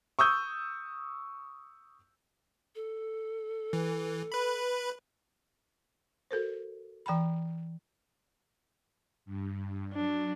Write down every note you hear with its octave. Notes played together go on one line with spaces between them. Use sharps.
C#6 D#6 E6 G6
A4
E3
B4 B5
F#4 A4 A#4 C5
E3 G5 A#5 B5
G2
F#3 D4